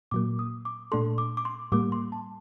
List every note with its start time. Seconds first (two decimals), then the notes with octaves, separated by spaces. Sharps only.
0.11 A#2 F#3 A#3 D6
0.39 D#6
0.65 D6
0.92 A#2 A3 D4 A4 C6
1.18 D6
1.37 D6
1.45 C6
1.72 A2 G3 A#3 D6
1.92 C6
2.12 A5